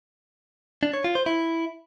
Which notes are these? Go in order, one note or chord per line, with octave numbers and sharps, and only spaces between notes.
D4
C#5
F4
C5
E4